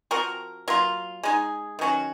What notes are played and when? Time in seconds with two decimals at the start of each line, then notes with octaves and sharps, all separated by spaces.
0.11 F3 C4 F#4 A#4
0.68 F#3 A#3 F4
1.23 G#3 D#4 G#4
1.79 D#3 F#3 C#4 F#4